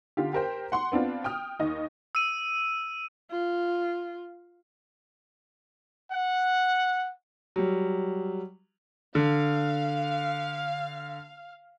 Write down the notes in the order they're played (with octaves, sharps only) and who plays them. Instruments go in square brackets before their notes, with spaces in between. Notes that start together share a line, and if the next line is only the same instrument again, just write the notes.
[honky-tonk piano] D3 F4 G4
G4 A#4 C5 G5
F#5 C6
B3 C4 D4 F4
G5 D#6 F6
D#2 D#4 D#5
[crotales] E6 D#7
[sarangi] F4
[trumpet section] F#5
[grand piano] F#3 G3
[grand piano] D3 [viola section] F5